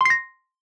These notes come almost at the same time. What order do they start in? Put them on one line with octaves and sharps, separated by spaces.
C6 C7 A#6